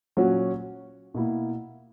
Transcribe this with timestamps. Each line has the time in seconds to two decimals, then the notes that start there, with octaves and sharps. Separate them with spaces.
0.17 A#2 F#3 C#4 F#4
1.14 B2 A#3 E4